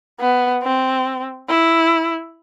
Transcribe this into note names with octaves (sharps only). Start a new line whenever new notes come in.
B3
C4
E4